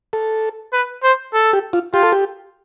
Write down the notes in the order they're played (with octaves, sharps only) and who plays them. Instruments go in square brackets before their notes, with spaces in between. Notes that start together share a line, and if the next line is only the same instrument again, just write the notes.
[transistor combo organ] A4
[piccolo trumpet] B4
C5
A4
[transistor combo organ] G4
F4
[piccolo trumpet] F4 [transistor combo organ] G4
[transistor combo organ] A4
G4